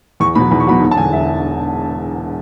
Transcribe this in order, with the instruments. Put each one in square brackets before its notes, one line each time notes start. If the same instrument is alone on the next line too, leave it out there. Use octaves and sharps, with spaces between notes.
[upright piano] E2 C#6
B2 F#3 B5
E2 B5
C#6
B2 F#3 B5
E1
A5
E2 D3 G#5
E1 E5